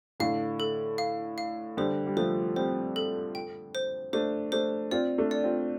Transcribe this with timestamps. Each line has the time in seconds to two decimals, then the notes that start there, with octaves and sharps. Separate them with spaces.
0.20 A2 D3 F5
0.60 A4
0.98 F5
1.38 F5
1.77 D3 G3 C5
2.07 G3
2.17 F3 A3 C5
2.56 G3 C4 C5
2.96 A4
3.35 G5
3.75 C5
4.13 A3 D4 C5
4.52 A3 D4 C5
4.91 C4 F4 D5
5.18 A3 D4
5.31 D5
5.44 C4 F4